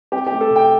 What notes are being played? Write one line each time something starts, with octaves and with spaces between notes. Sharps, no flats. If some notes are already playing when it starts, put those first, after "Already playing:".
C4 G4
G4
A3
A4
C3
G5